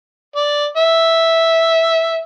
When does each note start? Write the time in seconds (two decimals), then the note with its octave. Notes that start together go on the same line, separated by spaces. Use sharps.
0.36 D5
0.77 E5